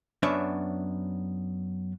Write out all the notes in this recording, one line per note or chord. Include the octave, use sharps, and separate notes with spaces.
F#2 B3 D4 C#5 E5